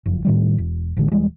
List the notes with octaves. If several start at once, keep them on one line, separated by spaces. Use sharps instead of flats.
F#1 F2
A2 D#3 G3
E1
A1 D3 G#3
D#1 E3 G3 G#3